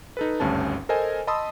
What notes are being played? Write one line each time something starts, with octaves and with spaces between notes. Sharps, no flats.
D#4 A4 B4
G#1 D2 G2 C#4 A5
A4 A#4 C5 D#5 G#5
D#5 A5 B5 C6 D#6 E6